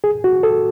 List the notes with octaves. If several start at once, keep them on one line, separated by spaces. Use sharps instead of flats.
G#4
F#4
A4